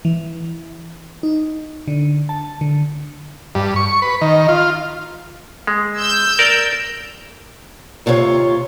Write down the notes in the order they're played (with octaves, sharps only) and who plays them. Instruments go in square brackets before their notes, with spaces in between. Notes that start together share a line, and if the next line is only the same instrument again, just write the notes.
[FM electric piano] E3
D#4
D3
A5
D3
[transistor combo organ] G2
C#6
B4
D#3
F4
[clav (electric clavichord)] G#3
[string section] E6 G6
[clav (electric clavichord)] A#4 D5
[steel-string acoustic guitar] D#2 C3 F4 A4 C#5